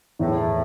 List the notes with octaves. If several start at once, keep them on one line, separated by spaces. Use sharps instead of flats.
E2 A2